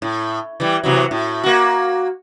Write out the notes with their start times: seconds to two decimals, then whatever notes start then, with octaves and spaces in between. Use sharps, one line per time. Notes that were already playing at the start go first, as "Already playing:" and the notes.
0.02 A2
0.60 E3 G3
0.84 C3 E3 F#3
1.11 A2
1.44 A#3 F#4